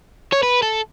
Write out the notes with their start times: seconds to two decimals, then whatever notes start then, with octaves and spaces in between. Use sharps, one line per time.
0.32 C#5
0.43 B4
0.62 A4